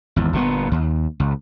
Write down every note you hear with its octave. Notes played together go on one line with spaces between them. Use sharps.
G#1 E2
G1 A#2 D3 B3
D#2
C#2